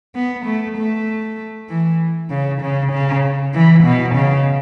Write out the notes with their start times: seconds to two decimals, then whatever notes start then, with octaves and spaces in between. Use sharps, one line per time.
0.15 B3
0.45 A3
0.77 A3
1.69 E3
2.30 C#3
2.61 C#3
2.92 C#3
3.54 E3
3.84 B2
4.15 C#3